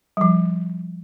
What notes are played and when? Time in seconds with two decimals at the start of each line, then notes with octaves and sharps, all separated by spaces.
0.17 G3
0.21 F3